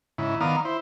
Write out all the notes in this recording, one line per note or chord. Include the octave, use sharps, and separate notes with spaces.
G#2 C#3 E4
D#3 B3 D5 F5 A#5 D#6
E4 C5